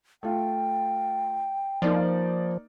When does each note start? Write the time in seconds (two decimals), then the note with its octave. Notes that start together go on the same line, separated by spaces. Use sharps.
0.23 A3 F4 G5
1.82 F3 A#3 D#4 D5